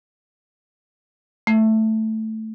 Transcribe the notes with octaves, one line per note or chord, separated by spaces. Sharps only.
A3